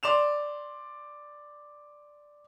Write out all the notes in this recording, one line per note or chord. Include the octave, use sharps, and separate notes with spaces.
D5 C6 E7 F7